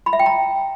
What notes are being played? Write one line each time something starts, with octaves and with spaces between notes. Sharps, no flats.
B5
E5
G5
A#5